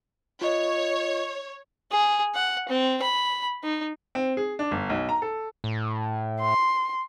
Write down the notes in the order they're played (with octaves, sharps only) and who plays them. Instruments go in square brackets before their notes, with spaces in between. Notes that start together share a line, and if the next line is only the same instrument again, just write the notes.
[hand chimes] F4 D#5 [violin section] C#5
[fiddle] G#4
F#5
C4
B5
D#4
[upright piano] C4
G#4
D4
G1
B1
A#5
A4
[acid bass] A2
[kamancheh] C6